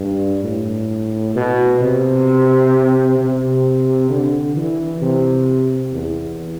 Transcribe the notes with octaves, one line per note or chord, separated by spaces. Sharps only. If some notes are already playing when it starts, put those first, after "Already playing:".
Already playing: G2
A2
B2
C3
C3
D3
E3
C3
E2